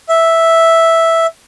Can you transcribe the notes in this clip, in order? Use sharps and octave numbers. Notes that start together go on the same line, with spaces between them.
E5